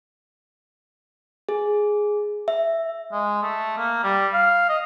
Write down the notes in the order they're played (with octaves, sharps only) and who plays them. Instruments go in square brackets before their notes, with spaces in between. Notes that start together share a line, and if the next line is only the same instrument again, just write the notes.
[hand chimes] G#4
E5
[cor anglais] G#3
A3
A#3
G3
F5
D#5